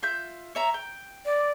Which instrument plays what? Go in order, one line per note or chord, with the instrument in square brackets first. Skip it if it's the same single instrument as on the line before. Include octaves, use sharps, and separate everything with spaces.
[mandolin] F4 E5 G6
C#5 E5 A#5
G5
[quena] D5